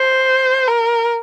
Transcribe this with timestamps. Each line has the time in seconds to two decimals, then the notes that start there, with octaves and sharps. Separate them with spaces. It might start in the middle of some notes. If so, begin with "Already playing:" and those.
Already playing: C5
0.68 A#4